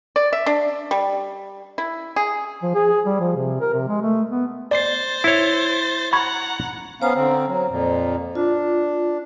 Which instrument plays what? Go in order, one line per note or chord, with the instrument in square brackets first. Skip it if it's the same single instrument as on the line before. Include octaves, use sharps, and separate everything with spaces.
[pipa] D5
E5
D4
G3
E4
G#4
[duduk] F3
G#4
G3
F3
C3
A#4
C3
G#3
A3
B3
[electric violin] C5 A6 [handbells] D5 C7
[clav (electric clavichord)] E4 C#5
[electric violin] F#5 A#5 [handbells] B5 C#6 G#6
[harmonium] B3 C#4 F5 [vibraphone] C5 A#5
[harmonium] D3 C4
F#3
F2 A#2
[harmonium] D4 [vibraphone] F4